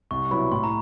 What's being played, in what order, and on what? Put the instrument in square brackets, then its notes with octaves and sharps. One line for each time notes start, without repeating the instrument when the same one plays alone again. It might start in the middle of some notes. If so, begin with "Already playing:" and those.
[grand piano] C2 [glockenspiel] C#6
[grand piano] B2 F#3 B3 E4 [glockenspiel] B5
[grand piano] A2 [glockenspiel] C6
[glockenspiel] A#5